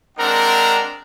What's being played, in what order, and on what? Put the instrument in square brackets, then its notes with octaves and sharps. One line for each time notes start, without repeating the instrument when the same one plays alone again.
[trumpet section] G#3 C4 D4 A#4 F#5 A#5